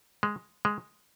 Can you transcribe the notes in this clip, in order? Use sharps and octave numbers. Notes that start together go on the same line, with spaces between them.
G#3
G#3